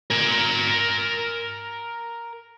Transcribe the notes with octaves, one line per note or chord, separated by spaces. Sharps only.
A#4 G#5